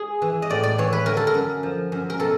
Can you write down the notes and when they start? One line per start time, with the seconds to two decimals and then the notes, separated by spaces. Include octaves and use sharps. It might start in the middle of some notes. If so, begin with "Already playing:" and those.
Already playing: G#4
0.22 E3
0.42 D#5
0.50 A2 D5
0.63 D5
0.78 E3 C#5
0.93 B4
1.06 D3 A#4
1.17 A4
1.27 A#4
1.34 F#2
1.63 F3
1.92 F#2
2.10 A#4
2.19 B2 A4